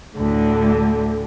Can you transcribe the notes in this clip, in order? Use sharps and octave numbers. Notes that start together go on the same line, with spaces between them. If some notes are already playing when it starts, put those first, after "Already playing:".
D2 A2 D3